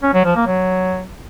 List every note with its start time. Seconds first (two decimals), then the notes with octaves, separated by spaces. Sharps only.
0.03 C#4
0.14 F#3
0.25 F3
0.36 A#3
0.47 F#3